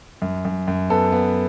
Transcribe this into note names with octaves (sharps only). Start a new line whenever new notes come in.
F#2
F#2
F#2
B3 A4
B3